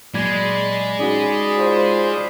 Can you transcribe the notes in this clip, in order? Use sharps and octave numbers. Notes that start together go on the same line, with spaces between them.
A#2 F#3 G#3 D5 B5 G#6
C#4 D#4 F#4 G#4 D5 B5
F4 C5